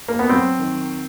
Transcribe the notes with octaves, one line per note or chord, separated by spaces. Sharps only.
A#3
B3
F#3 C4
D#3